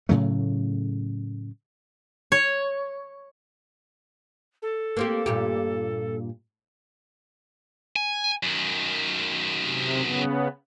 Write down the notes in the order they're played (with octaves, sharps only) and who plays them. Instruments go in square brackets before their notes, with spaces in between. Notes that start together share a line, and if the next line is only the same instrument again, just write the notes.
[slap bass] A2 C#3 F#3 A3
[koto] C#5
[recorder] A4
[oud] A#3 C4 G4
G2 A#2 G4
[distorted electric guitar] G#5
F#2 D#3
[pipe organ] C3
C#3 B3